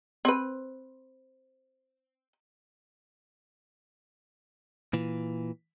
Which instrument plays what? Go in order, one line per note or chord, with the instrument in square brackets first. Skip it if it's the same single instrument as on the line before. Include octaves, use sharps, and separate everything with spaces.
[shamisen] C4 B4
[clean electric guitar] A#2 E3